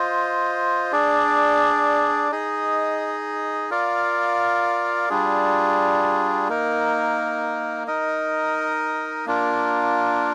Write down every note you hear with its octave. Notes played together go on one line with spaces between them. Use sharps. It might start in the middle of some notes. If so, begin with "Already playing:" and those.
Already playing: F4 C5 D#5
D4 G#4 D5
D#4 G#4 D#5
F4 A#4 D5 F5
G3 D4 F4 G#4
A#3 D#4 A#4
D#4 A#4 D#5
A#3 D4 F4 A#4